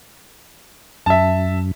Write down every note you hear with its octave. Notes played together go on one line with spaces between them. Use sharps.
F#2 E5 A5